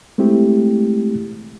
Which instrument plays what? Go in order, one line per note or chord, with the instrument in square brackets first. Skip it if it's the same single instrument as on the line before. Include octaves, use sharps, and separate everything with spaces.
[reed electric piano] G#3 A3 C4 E4 G4